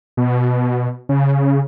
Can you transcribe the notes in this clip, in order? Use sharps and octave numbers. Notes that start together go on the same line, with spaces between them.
B2
C#3